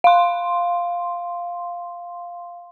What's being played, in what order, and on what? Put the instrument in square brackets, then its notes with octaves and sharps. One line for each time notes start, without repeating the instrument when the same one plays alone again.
[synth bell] F5 C6